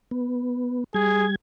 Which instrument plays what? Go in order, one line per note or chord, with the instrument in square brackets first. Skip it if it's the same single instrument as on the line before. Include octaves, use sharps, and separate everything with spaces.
[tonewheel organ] B3
[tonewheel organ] G3 G#6 [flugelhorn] G#4